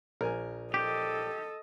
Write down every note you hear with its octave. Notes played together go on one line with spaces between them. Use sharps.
A#1 A#4 G#5
G4 A4 D#5